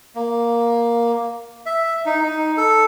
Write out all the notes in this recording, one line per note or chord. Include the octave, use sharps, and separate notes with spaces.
A#3
E5
D#4
D#4
A4